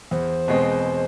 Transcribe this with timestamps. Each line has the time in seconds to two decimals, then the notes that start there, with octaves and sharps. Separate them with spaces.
0.11 E2 C5
0.48 B2 G#3 C4